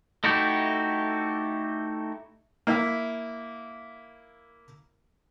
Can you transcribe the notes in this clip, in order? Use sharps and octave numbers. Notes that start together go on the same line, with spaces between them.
A3 D#4 E4 F#4 G4
A#3 E4 E5